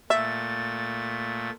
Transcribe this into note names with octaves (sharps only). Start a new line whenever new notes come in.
A#2 A3 E5 A6